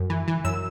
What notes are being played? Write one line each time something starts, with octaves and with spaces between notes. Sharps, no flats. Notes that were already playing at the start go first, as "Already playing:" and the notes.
Already playing: F#2
E3
E3
F#2 E6